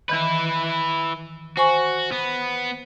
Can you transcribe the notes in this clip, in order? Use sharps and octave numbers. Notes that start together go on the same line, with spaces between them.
D#3 E3 E4 B4
F#4 C5 G#5 C#6
B3